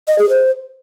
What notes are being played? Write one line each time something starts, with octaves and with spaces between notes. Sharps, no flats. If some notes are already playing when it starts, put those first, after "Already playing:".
D#5
G#4
C5